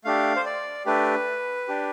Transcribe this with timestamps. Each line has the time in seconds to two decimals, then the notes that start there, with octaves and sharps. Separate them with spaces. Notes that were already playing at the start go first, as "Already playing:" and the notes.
0.05 A3 D4 G4 F5
0.36 C5
0.46 D5
0.86 A3 D4 G4 B4
1.68 D4 G4